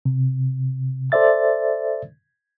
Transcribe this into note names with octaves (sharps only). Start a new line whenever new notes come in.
C3
A4 C5 D5 E5 A6